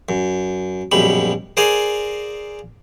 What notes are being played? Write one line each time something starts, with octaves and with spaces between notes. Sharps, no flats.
F#2
A#1 F#2 B2 G3 B5
G#4 A#4 C5 D5 F5 G#5